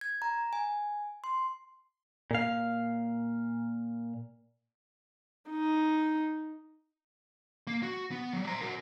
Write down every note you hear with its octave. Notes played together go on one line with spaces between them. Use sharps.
G#6
A#5
G#5
C6
A#2 F5
D#4
A#3
F#4
B3
F#3 G3
C5 A#5
F#4 A#4